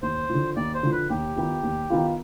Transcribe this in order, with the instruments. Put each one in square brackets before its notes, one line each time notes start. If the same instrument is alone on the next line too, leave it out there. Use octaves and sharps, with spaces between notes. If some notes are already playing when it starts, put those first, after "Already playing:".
[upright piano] D#2 [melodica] C5
[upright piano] D3 F3
[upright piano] D#2 [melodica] D5
[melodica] C5
[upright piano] D3 F3
[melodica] B4
[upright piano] D#2 [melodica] G4
[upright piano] D#3 B3 F4
D#2
D#3 B3 F4